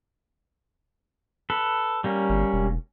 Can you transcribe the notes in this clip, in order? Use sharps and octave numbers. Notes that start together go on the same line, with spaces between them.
A4 B4
G3 A#3 C#4
G1
E1